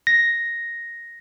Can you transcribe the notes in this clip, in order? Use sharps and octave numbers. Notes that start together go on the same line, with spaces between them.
A#6